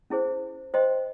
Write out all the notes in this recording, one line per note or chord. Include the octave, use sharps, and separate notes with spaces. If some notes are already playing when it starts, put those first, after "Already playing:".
C#4 E4 G#4 C5
C5 D#5 G5 C6